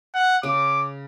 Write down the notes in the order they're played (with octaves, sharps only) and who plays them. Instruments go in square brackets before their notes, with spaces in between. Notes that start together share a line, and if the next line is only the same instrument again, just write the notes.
[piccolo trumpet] F#5
[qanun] C#3 [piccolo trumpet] D6